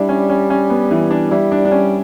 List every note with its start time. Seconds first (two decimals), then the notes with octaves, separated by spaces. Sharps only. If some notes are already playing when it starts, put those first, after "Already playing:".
Already playing: G3 D4 E4
0.09 C#4
0.29 C#4
0.50 C#4
0.70 B3
0.91 E3
1.11 D4
1.31 G3 E4
1.52 D4
1.65 D4
1.72 C#4